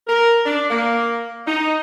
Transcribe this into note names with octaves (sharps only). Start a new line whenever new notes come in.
A#4
D4
A#3
D#4